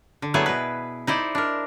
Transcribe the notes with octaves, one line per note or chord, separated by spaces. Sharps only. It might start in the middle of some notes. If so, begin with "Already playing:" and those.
D3
F#3 A3 B3 E4 G#4
B2 B4
D#4 E4 C5 D5
D4 A#4